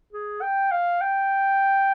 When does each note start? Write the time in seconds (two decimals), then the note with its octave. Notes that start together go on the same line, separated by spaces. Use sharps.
0.13 G#4
0.42 G5
0.72 F5
1.01 G5